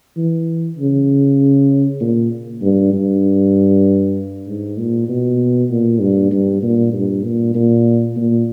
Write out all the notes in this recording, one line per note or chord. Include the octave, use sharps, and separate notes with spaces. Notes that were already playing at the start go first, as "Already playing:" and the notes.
E3
C#3
A#2
G2
G2
G#2
A#2
B2
A#2
G2
G2
A#2
G2
A#2
A#2
A#2